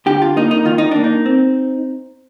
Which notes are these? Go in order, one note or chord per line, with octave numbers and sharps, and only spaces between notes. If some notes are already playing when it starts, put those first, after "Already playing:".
D3 G4
F4
A#3 D#4
D#4
D#3 F4
D#4
A#3 D4
D#4
C4